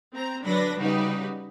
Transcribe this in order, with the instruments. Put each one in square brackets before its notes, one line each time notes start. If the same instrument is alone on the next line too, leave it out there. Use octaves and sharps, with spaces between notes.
[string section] C4 A#5
D3 F#3 D4 B4 B5 A#6
C#3 G3 D#4 F#4 G4 B4